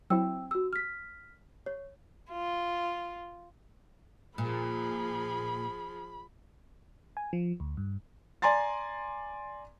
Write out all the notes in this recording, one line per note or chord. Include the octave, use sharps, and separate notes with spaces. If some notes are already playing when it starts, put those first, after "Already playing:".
F#3 C4 E4 G5 E6
F#4 E6
F6 B6
C#5
F4
A#2 F3 G#4 B5
G#5
F3
D2
G2
D5 G#5 A#5 C6 A6